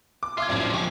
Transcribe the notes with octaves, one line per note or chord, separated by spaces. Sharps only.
D6
F4 E5 D6 G#6
A#1 F#2 F3 G3
F3 G#3 C#6